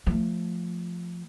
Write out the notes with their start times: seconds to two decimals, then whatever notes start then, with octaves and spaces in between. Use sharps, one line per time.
0.07 F3 A3